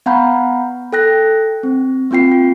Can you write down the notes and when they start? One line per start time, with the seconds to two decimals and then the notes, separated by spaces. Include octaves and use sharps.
0.06 B3 F5 F#5 A#5 B5 G6
0.93 A4 G5 F#6 A#6
1.63 C4
2.11 A#3 C4 F4 G5 C7
2.32 F4